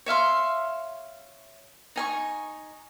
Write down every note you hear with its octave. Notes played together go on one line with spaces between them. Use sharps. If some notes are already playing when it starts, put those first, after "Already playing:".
C#5 E5 F5 C6
D#4 G#5 C#6